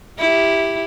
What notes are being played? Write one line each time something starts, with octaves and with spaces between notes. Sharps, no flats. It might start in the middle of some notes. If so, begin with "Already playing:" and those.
E4 G4